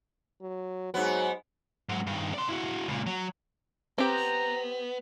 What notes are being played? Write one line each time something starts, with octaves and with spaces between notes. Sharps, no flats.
F#3
G#2 F#3 B3
G#2 F#3
G2 D#3
D5 C6
E4 F#4
C#2 A#2
F#3
B3 C4 G4 A#5